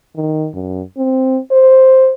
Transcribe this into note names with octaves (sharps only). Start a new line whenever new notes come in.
D#3
F#2
C4
C5